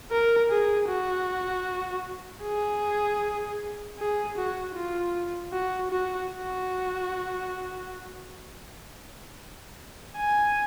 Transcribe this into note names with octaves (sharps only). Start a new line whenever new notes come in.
A#4
G#4
F#4
G#4
G#4
F#4
F4
F#4
F#4
F#4
G#5